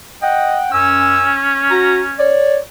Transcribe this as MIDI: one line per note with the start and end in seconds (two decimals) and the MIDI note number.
0.22 0.57 75
0.22 0.69 78
0.22 0.69 79
0.72 1.35 42
0.72 2.41 61
0.72 1.35 80
0.72 1.35 88
1.70 2.02 66
1.70 2.02 82
2.19 2.58 73
2.19 2.58 74